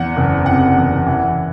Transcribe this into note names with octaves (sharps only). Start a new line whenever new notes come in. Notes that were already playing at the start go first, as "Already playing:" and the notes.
Already playing: E2 F#5
F#1
C3 F#5
E2
E3